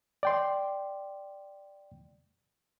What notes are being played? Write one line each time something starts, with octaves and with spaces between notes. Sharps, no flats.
D5 G5 C6